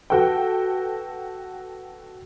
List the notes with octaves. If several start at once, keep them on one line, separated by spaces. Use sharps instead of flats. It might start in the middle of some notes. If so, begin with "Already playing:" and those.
F#4 A4 B4 G5